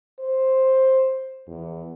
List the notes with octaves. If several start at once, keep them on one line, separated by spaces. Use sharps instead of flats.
C5
E2